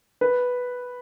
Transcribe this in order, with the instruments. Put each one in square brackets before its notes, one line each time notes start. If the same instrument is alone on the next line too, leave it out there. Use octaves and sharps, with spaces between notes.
[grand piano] B4